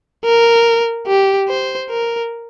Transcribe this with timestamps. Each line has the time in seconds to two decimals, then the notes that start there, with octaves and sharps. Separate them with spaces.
0.25 A#4
1.07 G4
1.49 C5
1.90 A#4